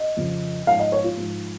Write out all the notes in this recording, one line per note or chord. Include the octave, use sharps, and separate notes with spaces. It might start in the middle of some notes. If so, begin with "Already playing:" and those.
Already playing: D#5
F2 C#3 F3
G#2 F3 F5
D#5
C#5
F4
G#2 F3